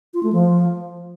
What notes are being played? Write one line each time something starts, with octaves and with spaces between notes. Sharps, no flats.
F4
A3
F3